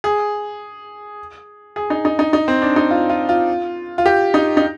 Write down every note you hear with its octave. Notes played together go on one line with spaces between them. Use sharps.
G#4
G#4
D#4
D#4
D#4
D#4
C4
D4
D#4
F4
F4
F4
F4
G4
D#4
D#4